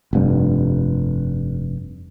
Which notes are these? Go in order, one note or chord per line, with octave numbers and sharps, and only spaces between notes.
F1 G2